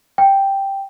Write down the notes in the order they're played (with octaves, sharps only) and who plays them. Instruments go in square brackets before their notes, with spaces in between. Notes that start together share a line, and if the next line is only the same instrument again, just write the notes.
[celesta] G5